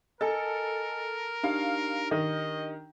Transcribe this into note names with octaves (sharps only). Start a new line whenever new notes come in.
A4 A#4 D#5 G#5
D4 D#4 G4 F5
D#3 D#5